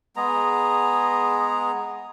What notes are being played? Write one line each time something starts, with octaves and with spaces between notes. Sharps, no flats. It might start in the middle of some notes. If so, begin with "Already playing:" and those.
G#3 B3 G#4 A#5